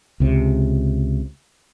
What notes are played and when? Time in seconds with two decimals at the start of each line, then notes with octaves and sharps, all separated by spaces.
0.20 C#2 C3